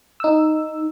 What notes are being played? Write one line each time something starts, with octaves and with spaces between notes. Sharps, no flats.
D#4 E6